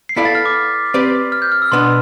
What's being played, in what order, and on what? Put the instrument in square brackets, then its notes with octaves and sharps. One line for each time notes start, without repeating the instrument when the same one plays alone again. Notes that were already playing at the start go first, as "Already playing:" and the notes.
[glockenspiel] C7
[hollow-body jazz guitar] B3 E4 A4 D5 F5 [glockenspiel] B6
[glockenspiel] A6
F6
D6
[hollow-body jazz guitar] C4 G4 B4 D5
[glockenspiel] F6
G6
F6
E6
[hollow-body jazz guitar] B2 B3 D4 [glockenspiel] C6